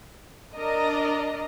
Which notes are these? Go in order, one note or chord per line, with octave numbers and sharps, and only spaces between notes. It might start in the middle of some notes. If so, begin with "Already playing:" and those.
D4 A#4 D#5 A#5